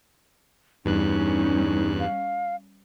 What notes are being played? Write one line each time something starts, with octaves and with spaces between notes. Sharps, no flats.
E2 G2 G3 C#4 D#4 F#6
F5